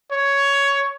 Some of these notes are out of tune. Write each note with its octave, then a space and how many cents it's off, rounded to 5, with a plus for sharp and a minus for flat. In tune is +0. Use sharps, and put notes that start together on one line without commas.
C#5 +10